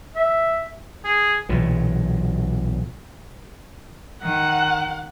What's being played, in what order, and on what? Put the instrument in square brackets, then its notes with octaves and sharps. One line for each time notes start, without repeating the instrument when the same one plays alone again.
[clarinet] E5
[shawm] G#4
[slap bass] B1 A#2 E3 F#3
[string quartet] D#3 [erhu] F#5